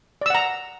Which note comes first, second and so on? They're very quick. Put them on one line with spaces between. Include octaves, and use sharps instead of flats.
D5 E6 F#5 A#5